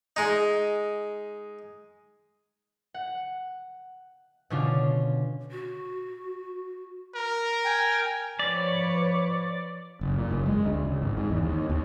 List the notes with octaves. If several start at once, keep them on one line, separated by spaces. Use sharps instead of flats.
G#3 D#4
F#5
B2 D3 C#4 D4 F4
F#4
A#4
G5 G#5
F3 B4 C#5 D5
F#1
A#2
F#1
G#3
D2
C#2
G#1
G#2
E2
D#2
D#2